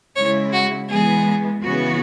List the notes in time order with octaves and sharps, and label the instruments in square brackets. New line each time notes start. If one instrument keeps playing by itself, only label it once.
[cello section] C#3 G#3 E4 [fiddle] C#5
[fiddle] F#4
[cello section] E3 G#3 B3 [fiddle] G#4
[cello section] C#3 E3 B3 F#4